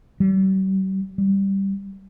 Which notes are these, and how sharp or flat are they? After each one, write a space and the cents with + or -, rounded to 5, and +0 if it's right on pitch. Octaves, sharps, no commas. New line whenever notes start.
G3 -45
G3 +0